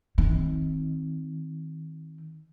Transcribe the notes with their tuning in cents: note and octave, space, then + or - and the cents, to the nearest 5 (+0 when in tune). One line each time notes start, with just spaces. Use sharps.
D#3 +25 C4 +0